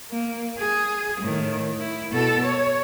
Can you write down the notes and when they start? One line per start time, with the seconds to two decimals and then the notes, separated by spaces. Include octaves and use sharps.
0.10 A#3
0.58 G#4
1.21 A2 D#3
1.79 E4
2.11 B2 A4
2.45 C#5